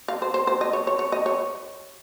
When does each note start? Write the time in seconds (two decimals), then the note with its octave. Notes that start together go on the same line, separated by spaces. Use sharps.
0.08 F5
0.22 C5
0.34 C5
0.47 C5
0.61 D#5
0.73 C#5
0.87 C#5
0.99 C#5
1.12 D#5
1.26 C#5